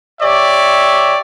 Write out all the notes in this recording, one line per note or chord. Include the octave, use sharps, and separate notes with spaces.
G4 C#5 D5 E5